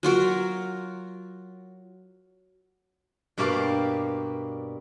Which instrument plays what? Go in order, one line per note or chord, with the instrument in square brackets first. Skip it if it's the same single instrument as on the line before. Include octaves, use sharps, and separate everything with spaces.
[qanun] F#3 F4 F#4 A#4
[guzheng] G2 B2 A#3 G4 D5 F5